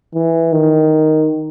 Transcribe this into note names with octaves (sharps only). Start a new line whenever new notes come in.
E3
D#3